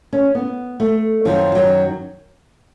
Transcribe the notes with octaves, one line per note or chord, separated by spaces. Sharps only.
C#4
B3
A3
F#2 D#3 F3
F#3